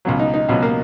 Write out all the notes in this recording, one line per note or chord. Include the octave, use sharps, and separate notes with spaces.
C#2 B2 F#3
D#4
D#4
C#2 B2 F#3
A#3